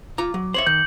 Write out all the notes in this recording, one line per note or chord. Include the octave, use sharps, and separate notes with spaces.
F4 A#5 D6
F#3
C5 C#5 E5 C#7 F#7
D#3 G6